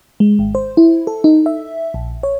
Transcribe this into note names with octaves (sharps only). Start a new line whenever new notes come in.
G#3
G#1
C5
E4
A4
D#4
E5
A#1
C#5